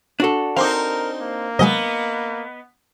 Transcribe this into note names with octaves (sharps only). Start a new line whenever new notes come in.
D4 F#4 A4
C4 D#4 A#4 F5 C6 D6
A#3
C3 F#3 G#3 B3 D#5